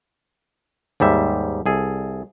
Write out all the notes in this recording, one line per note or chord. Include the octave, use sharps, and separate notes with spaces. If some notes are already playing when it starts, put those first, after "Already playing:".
D#2 G#2 G3 E5
C2 G#4 A4